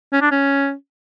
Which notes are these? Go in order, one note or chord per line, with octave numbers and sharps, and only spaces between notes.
C#4
D4
C#4